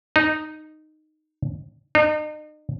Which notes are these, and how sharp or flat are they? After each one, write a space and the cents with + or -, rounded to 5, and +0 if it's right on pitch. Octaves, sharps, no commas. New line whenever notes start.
D#4 -10
D#4 -40